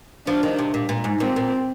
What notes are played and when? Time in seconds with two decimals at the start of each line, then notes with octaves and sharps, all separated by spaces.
0.27 F3 D4
0.43 D#3
0.59 C3
0.74 A#2
0.89 A#2
1.04 G#2
1.20 A#2 C4
1.36 A#2